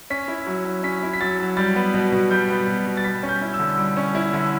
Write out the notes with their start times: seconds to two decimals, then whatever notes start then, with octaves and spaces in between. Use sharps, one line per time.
0.10 C#4 B6
0.28 E4
0.47 F#3
0.65 F#3
0.83 C#4 B6
1.03 E4
1.13 B6
1.21 F#3 A6
1.39 F#3
1.57 G3 A6
1.76 B3
1.94 B2
2.12 B2
2.31 G3 G6
2.50 B3
2.68 B2
2.86 B2
2.97 A6
3.04 G3 B6
3.23 C#4
3.29 G6
3.41 E4
3.54 E6
3.59 D3
3.78 G3
3.97 C#4
4.15 E4
4.34 D3